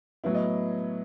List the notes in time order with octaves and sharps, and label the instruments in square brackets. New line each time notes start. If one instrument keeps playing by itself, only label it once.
[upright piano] A2 F#3 B3 E4
D#5